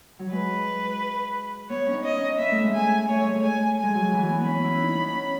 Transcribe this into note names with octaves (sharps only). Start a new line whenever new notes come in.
F#3
G#3 B4
B3 C#5
C#4
D#4
D#5
C#4
B3 E5
A3
G#3
A3 G#5
A3 C#5
G#3
A3
G#5
G#5
G#3
F#3
E3
B3
B3
C#4 B5
E4
D#4
B3 C#4